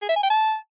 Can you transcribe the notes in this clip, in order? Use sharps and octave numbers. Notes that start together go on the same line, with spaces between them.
G#4
E5
G#5
G5
A5